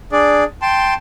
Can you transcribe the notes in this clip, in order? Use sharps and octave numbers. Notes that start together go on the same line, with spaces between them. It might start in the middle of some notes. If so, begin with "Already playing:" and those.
D4 G#4 D5
G5 A5 C6